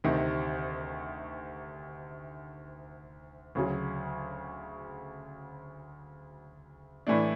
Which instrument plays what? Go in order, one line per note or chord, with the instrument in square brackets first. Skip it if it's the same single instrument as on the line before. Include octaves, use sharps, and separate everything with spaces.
[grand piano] D2 C3 D#3
D2 C#3 F#3
A2 E3 A3 D4